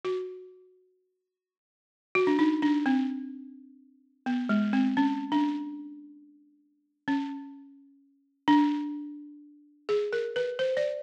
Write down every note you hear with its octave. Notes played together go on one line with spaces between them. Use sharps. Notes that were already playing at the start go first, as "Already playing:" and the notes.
F#4
F#4
D4
D#4
D4
C4
B3
G#3
C4
C#4
D4
C#4
D4
G#4
A#4
B4
C5
D5